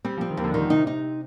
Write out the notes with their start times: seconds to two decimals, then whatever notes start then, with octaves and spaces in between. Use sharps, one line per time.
0.05 G3 C4
0.17 F3 C4
0.31 D#3
0.37 D#2
0.44 D3 F3
0.54 D#3
0.70 C3 D#4
0.87 D#4